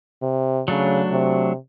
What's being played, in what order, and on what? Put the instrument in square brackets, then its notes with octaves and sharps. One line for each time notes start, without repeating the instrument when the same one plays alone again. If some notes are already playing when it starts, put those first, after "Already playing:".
[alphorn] C3
[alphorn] C#3 [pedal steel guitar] F#3 A3 D4
[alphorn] C3